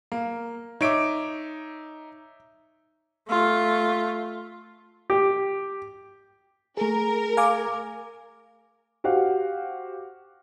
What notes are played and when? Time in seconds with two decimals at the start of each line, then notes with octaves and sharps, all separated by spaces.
0.12 A#3
0.81 D#4 C#5 E5 D6 D7
3.29 A3 F4
5.10 G4
6.77 A3 G#4 A#4
7.37 F5 G#5 D6
9.04 F#4 G4 C5 F5 F#5